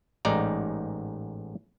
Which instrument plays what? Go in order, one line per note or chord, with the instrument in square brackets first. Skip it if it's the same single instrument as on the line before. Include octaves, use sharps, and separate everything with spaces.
[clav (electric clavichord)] A1 G#2 D#4 D5 A#5